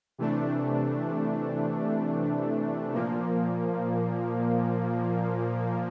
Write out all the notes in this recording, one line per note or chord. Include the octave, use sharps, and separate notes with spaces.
C3 E3 A3 D4
A#2 F3 A#3